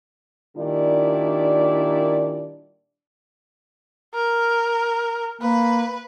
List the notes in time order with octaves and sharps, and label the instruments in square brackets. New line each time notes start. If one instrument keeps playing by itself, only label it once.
[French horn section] A#2 D#3 G3 D4 E4 D5
[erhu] A#4
[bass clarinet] A#3 [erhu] B4